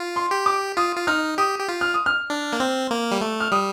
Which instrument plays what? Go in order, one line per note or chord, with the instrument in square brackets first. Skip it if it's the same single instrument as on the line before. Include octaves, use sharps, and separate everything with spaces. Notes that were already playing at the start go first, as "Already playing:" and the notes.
Already playing: [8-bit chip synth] F4
[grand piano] C6
[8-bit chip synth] G4
[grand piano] D6
[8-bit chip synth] F4 [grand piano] D#6
[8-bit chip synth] F4
[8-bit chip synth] D#4 [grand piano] F6
[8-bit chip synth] G4 [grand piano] D#6
[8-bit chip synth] G4
F4
[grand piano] F6
D#6
F6
[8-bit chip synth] D4
A#3
C4
A#3
G3
A3
[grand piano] F6
[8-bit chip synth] G3 [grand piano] D#6